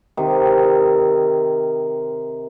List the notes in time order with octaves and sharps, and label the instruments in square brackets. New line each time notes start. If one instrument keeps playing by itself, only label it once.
[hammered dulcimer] C3 D#3